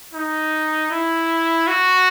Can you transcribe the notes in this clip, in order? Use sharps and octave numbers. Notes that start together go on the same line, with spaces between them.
D#4
E4
F#4